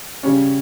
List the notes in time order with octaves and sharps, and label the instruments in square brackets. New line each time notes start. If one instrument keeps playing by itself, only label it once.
[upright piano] C#3 G3 C#4